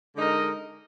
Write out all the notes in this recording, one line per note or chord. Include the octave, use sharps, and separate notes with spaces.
D3 G#3 D#4 A#4 D#5